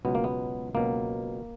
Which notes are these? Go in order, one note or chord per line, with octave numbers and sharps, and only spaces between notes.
C#2 B2 F#3 B3
A#3
B3
C#2 B2 F#3 A#3